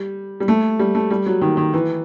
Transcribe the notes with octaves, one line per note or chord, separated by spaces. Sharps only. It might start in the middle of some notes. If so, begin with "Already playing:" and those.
Already playing: G3
G3
A3
G3
A3
G3
F#3
D#3
D#3
E3